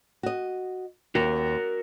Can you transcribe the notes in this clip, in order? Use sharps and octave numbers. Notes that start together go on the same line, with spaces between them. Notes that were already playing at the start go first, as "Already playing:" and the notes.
F#4 D#5
D#2 F#4 A#4